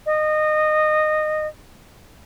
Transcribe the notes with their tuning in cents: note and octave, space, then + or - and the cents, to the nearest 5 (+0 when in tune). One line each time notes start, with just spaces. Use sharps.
D#5 -20